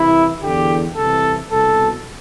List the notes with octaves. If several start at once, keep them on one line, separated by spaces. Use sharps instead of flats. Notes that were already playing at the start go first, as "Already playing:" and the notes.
Already playing: C2 C3 E3 E4
D3 G4
E2
C2 C3 E3 A4
C2 B2 A4